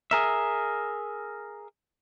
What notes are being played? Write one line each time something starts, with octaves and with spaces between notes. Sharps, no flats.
G#4 A#4 E5